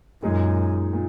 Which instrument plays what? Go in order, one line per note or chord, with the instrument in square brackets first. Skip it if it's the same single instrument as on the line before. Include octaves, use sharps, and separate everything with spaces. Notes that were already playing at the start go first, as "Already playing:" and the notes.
[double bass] F#2 [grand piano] A#2 G#3 D#4 G#4
[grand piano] A#2